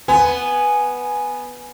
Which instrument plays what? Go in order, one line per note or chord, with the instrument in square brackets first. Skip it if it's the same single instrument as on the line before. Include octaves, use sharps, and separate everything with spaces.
[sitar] B3 [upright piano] G#5